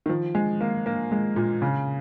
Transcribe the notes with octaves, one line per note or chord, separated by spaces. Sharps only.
D#3
F3
G#3
A#3
A#3
G#3
A#2
C#3